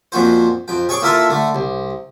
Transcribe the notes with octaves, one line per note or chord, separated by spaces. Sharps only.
F2 A#2 F#4 C5
F2 G5
G#4 C#5 G5 C#6 D6
A#3 E4 F4 A4 A#4 E5
D3 A3
C2